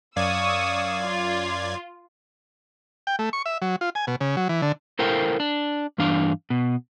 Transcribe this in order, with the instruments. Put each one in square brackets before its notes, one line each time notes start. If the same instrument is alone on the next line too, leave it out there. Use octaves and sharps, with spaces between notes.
[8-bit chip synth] F#2 D5 G#6 [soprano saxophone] F5 [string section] C#6 D#6 E6
[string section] F4
[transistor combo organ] G5
A3
C#6
E5
F#3
F4
G#5
B2
C#3
F#3
E3
D3
[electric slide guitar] E4 A4 A#4 C5 F5 G5
D4
G2 E3 D4 F5
B2